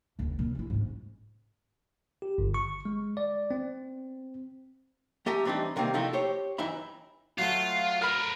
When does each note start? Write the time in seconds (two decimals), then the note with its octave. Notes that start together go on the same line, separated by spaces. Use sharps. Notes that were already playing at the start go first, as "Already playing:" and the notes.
0.19 F#1 D#2
0.39 A#2
0.55 C#4 E4
0.70 G#2 C#4
2.22 G4
2.38 G1
2.54 C#6
2.85 G#3
3.17 D5
3.51 C4
5.26 A3 G4 G#5 A#5
5.45 E3 G3 C4 D4 D#4
5.76 C3 D#3 G3 A#3 C4
5.94 C3 F3 A3 C4 D#4 E4
6.13 G4 C5 C#5
6.58 G2 E3 D#4 E5 B5
7.38 F#3 A3 F4
8.02 A#4 B4 B5 F6